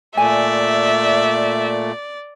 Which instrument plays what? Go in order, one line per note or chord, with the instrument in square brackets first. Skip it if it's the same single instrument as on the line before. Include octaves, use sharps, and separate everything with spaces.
[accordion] A#2 A3 [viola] D5 [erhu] E5 [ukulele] G#5